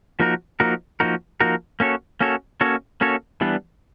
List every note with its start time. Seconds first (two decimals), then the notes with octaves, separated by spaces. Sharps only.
0.20 F3 A#3 D#4 F#4 A#4
0.60 F3 A#3 D#4 F#4 A#4
1.00 F3 A#3 D#4 F#4 A#4
1.40 F3 A#3 D#4 F#4 A#4
1.80 A#3 C#4 F#4 A4 C#5
2.21 A#3 C#4 F#4 A4 C#5
2.61 A#3 C#4 F#4 A4 C#5
3.01 A#3 C#4 F#4 A4 C#5
3.41 E3 G3 B3 D4